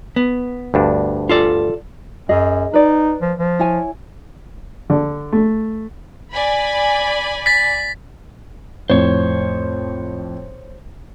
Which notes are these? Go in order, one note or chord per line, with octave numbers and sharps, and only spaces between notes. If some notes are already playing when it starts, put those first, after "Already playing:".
B3
D2 G2 D4
F4 A4 D5
F#2 G#4 C#5 D#5
D#4 B4 D5
F3
F3
E4 C#5 G#5
D3
A3
D5 G#5 B5
A6 B6
F2 A2 C5 C#5